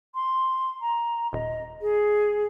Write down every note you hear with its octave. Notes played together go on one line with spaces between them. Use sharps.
C6
A#5
D#1 D#5
G#4